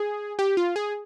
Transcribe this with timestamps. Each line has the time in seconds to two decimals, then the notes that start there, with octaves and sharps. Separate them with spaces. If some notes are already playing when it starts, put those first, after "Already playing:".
Already playing: G#4
0.39 G4
0.57 F4
0.76 G#4